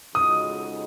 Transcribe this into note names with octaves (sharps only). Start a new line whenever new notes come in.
F2 C#3 G#3 D#4 F#4 D#6